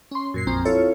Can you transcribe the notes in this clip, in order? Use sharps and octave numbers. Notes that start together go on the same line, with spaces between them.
C#4 C6
F#2 A#2 C7
A#1 F2 C4 A#5
E4 F4 A4 C#5